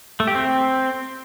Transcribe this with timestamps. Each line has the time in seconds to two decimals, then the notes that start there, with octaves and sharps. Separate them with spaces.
0.20 A3
0.27 G4
0.35 C4